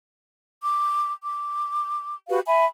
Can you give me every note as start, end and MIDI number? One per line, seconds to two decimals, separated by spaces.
0.62 1.12 86
1.23 2.15 86
2.28 2.39 66
2.28 2.39 67
2.28 2.39 71
2.28 2.39 77
2.45 2.64 76
2.45 2.64 80
2.45 2.64 83